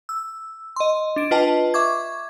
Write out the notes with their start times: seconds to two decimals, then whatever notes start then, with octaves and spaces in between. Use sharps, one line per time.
0.09 E6
0.76 D#5 C6
1.16 D4 D7
1.31 F4 B4 D#5 G5 A5
1.74 E5 C#6 D6 G#6